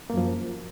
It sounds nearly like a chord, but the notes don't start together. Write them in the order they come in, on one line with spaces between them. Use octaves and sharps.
A#3 F#2 F3